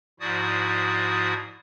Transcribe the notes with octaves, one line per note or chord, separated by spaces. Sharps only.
G#2 F3 E4 F#4 D5 D#6